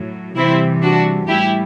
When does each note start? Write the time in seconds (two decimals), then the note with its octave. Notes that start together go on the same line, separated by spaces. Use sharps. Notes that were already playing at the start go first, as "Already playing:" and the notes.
Already playing: A2 F#3
0.36 C3 E3 G3 C4 E4
0.82 D4 F#4
1.28 A2 G3 E4 G4